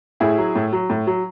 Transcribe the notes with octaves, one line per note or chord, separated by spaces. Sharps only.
A2 E4 G#4
F#3
A2
F#3
A2
F#3